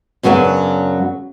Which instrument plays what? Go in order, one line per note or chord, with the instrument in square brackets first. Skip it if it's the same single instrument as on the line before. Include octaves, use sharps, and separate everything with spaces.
[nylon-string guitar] F#2 C#3 F#3 B3 D4